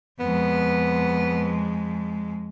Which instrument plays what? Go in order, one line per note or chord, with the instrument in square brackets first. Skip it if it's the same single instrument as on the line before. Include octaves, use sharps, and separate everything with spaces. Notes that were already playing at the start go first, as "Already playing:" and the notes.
[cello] F2 G#3 [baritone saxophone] B3